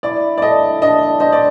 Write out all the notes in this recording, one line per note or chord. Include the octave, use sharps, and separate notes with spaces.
E4 D5
D5
A4 D#5
D4 D#5
C5 D#5
D5